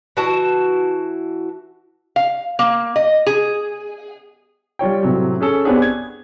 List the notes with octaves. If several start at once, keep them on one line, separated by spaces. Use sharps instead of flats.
E3 F#4 A5
F5
A#3
D#5
G#4
G3 F4 C#5 G5
A2 C3 F#3
C#4 G#4 A4
B3 C4 D4 G4 G#4 C#5
G#6